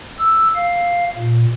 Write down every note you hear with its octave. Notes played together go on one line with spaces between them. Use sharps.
E6
F5
A#2